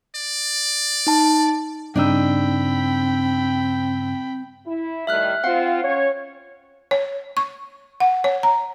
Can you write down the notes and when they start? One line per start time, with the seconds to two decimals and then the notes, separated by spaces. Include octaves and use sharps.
0.15 D5
1.07 D#4 A5
1.96 G2 C#3 C4 D4 D#4 G5 B5 E6
4.66 E4
5.07 A2 D#3 G3 E5 F6 F#6
5.44 C4 F4 F5 F#5
5.83 C#4 C#5
6.91 C#5
7.37 C#6
8.00 F#5
8.24 C#5
8.43 A#5